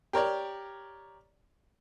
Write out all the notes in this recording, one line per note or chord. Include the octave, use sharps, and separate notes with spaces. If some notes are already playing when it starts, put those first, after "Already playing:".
G4 A#4 C#5 D5